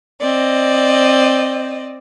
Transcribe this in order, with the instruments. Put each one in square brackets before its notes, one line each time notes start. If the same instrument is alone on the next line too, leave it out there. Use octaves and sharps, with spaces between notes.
[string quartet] C4 D5 D#5